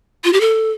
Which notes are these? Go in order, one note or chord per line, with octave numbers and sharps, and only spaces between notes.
F4
G4
A4